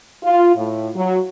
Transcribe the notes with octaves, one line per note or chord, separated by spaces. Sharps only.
F4
A2
F#3